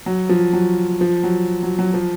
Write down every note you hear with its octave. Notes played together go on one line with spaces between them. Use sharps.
F#3
F3
F#3
F3
F#3
F#3
F#3
F3